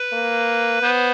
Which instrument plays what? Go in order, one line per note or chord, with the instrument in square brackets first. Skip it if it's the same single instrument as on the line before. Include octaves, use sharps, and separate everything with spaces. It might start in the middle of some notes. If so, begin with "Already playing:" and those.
Already playing: [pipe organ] B4
[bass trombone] A#3
[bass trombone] B3 [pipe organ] C5